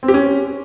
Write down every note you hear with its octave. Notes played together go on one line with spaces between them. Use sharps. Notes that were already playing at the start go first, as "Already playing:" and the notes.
C4
G4
C#4